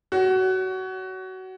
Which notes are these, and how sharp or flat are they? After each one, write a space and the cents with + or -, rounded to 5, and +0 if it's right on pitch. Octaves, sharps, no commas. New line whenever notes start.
F#4 +20 C#5 +25